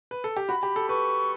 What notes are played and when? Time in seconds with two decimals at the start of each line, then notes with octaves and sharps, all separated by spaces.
0.11 B4
0.24 A4
0.37 G4
0.48 F#4 B5
0.63 G4
0.76 A4
0.89 B4 C#6